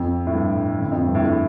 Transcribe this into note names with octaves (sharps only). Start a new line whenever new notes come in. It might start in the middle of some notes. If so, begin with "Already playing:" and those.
Already playing: F2
A2
G2
D3
F2
G2
A2
A2